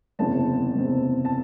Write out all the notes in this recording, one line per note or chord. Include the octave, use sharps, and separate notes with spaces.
F#1 E2 C3 A5
F#1 E2 C3
A5